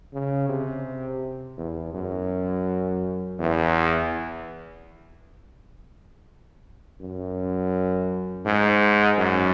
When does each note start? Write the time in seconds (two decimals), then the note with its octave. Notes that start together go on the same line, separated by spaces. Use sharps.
0.13 C#3
0.49 C3
1.57 E2
1.94 F#2
3.39 E2
7.01 F#2
8.46 G#2
9.18 F#2